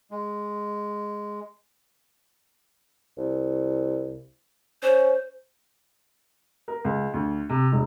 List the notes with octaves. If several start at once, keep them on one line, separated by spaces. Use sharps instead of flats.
G#3
C2
C#4 C5
A#4
C#2
D2
C3
E1